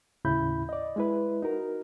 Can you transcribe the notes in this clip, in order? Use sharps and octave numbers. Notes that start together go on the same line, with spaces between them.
D#2 A2 C#3 E4 B5 G6
D5 D#5
G#3 E4 B4
D#4 F#4 A#4